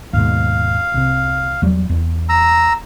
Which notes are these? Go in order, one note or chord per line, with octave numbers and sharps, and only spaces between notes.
D#2 G#2 B2 F5
C2 C3
E2 F#3 G3
E2
A#5 E6